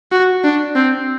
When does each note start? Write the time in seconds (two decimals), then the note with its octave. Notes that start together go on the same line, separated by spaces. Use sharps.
0.11 F#4
0.44 D4
0.75 C4